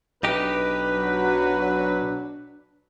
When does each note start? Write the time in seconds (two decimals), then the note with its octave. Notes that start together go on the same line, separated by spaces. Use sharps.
0.23 B1 D4 D#4 G4 B4
0.94 F#3